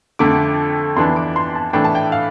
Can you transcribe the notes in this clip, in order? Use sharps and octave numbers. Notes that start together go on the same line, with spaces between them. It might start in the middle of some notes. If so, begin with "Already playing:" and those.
F2 D3 A3 D6
F2 E3 B3 D4 C6
D6
C6
A5
A2 E3 A3 D4 G5
A5
G5
F5